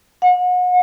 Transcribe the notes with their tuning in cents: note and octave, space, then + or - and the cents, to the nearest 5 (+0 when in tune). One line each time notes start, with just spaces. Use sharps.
F#5 -35